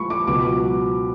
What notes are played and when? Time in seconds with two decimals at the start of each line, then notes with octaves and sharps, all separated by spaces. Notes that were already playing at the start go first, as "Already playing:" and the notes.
Already playing: F3 G#3 B5 C#6
0.10 D6
0.27 C#2 B2 F#3 D6